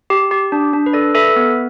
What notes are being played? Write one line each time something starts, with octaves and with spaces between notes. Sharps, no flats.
G4
G4
D4
D4
B4
A4 D5
A4 B4 E5
B3